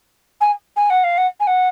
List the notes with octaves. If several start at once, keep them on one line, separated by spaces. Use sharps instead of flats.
G#5
G#5
F#5
F5
F#5
G#5
F#5